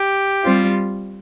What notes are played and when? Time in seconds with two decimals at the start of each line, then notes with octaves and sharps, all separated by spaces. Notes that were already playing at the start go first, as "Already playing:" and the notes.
Already playing: G4
0.44 G3 C4 F4